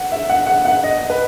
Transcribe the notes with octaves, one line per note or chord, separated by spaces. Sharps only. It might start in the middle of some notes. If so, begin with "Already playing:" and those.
Already playing: F#5
E5
F#5
F#5
F#5
D#5
B4